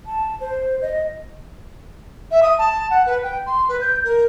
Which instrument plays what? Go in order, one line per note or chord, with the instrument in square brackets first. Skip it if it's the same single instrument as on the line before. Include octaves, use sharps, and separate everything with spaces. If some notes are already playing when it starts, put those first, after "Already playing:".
[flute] A5
C5
D#5
[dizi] E5
D#6
A5
F#5
B4
G5
C6
B4
G6
A#4